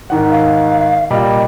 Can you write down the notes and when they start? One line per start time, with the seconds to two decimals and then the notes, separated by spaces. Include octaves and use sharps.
0.10 G#2 D#3 F#5
0.31 F5
1.11 A#2 G3 D#5